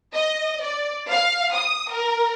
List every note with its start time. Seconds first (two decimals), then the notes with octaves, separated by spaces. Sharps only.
0.14 D#5
0.62 D5
1.10 F5
1.53 D#6
1.90 A#4